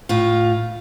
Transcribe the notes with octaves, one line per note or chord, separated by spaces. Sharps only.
A2 F4